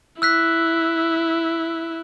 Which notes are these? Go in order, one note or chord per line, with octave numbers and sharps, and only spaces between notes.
E4 E6 F#6 B6